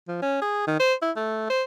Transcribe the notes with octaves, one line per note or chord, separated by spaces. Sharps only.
F3
C#4
G#4
D#3
C5
E4
A3
C5